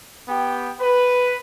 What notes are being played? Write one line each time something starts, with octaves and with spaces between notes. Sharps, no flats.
B3 G4 G5
B4